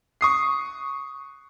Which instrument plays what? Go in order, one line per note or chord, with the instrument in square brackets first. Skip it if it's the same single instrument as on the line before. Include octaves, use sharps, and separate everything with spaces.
[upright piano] C#6 D#6 C7